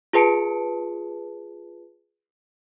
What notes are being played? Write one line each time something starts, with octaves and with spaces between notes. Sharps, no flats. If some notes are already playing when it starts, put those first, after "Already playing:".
F4 G#4 B4 A5 C#7 D7